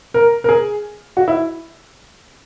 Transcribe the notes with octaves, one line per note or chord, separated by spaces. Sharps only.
A#4
A#4
G#4
F#4
E4